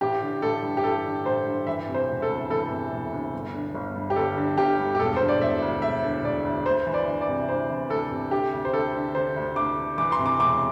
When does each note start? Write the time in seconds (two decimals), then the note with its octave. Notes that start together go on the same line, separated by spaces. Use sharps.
0.01 A1 G4
0.21 D3
0.42 A1 A4
0.63 G2
0.77 G4
0.84 A1 A4
1.05 D3
1.25 A1 C5
1.46 G2
1.67 E3 E5
1.88 C3
1.94 C5
2.08 E1
2.22 A4
2.29 D2
2.50 E3 A4
2.71 C3
2.92 E1
3.12 D2
3.33 G1
3.54 D3
3.74 G1
3.95 G2
4.10 G4
4.16 G1 A4
4.37 D3
4.58 G1 G4
4.79 G2
4.95 G4
4.99 E1 A4
5.16 D3 C5
5.28 D5
5.41 E1 E5
5.62 D2
5.82 E1 E5
6.03 D3
6.24 E1 D5
6.45 D2
6.65 D2 C5
6.87 E3
6.94 D5
7.07 D2
7.21 D5
7.28 C3
7.49 D2 C5
7.69 E3
7.90 D2 A4
8.11 C3
8.31 D3 G4
8.53 D2
8.65 C5
8.73 D2 A4
8.94 D3
9.15 D3 C5
9.36 D2
9.56 D2 D6
9.77 D3
9.98 E3 D6
10.12 C6
10.19 C3
10.26 D6
10.39 E1 D6